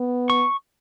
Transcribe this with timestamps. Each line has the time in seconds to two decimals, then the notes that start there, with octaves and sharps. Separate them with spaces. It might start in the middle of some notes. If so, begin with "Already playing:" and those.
Already playing: B3
0.30 C#6